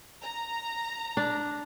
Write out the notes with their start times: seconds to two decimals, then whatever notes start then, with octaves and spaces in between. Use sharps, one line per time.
0.21 A#5
1.17 D4